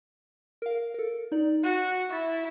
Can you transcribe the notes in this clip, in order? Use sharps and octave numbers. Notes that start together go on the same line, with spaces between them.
A#4 F5
A4 A#4
D#4 D5
F#4 F#6
E4 C#6 A6